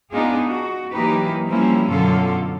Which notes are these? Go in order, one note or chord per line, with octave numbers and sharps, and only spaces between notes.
B3 D4 D#4 F4 G#4
F#4
E3 F#3 A#3 D#4 G4 B4
F3 G3 A#3 C4 C#4 E4
F#2 B2 D3 F4 A4